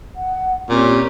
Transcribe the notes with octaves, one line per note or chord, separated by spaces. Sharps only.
F#5
A#2 C4 C#4 G4